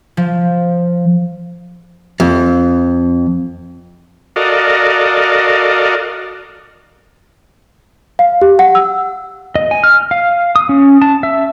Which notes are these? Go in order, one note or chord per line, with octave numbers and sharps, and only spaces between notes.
F3
F2
F#4 A4 A#4 D5 D#5 F5
F5
G4
F#5
E6
D#5
G#5
F6
F5
D#6
C#4
A5
E5